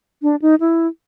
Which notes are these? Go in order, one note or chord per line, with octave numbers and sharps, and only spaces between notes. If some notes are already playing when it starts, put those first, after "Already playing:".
D4
D#4
E4